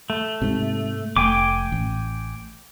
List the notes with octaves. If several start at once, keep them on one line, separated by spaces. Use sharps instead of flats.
A3
G#2 C3
F1 A3 G5 G#5 D6
A1